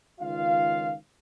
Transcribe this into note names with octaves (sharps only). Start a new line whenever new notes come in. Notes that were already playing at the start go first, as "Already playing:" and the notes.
C#2 D#3 F4 F5